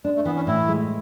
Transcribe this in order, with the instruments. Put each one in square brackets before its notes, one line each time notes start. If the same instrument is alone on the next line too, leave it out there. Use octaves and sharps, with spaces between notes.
[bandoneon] G#3 [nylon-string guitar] D4
[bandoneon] A3
[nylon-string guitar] E3 [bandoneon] B3
[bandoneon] C#4
[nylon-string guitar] A2 [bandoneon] E4
[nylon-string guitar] G#3